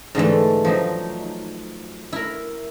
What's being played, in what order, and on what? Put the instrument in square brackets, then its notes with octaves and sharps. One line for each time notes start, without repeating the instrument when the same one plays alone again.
[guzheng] G#2 D3 E3 A3
F3 F#3 D#4
E4 A#4